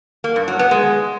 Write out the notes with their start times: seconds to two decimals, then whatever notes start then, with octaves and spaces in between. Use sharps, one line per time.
0.24 A#3
0.36 G2
0.48 F#3
0.59 B3
0.71 G#3